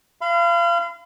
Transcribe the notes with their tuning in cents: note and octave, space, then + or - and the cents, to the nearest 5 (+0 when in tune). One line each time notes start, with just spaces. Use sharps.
F5 -30 B5 +35